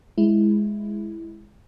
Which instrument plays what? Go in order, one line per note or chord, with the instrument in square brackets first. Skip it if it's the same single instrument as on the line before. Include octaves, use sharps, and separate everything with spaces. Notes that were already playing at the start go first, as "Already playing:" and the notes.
[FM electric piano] G#3 E4